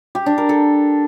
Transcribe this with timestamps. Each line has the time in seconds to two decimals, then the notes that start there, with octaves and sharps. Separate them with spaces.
0.15 G4
0.26 D4
0.38 A#4
0.49 A4